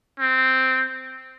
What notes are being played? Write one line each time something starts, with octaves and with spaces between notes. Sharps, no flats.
C4